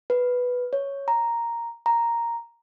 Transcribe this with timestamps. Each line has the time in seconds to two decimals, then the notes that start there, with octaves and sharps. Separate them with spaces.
0.10 B4
0.73 C#5
1.08 A#5
1.86 A#5